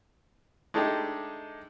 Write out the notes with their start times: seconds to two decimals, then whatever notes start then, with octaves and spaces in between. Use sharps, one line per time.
0.74 G#3 A3 D4 D#4 G4 A4